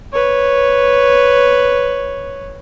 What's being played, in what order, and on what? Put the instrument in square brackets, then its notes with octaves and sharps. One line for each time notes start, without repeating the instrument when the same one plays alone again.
[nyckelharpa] B4 C#5